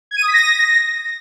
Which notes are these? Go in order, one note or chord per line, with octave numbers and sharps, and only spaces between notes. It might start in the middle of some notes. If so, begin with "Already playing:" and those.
G#6
D#7
D#6
B6
A#6